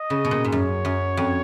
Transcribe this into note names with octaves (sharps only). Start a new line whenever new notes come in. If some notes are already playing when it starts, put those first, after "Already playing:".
Already playing: D#5
C#3
B2
A#2
G#2
F#2 C#5
F#2
F2